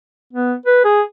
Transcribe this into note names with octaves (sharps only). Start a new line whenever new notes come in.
B3
B4
G#4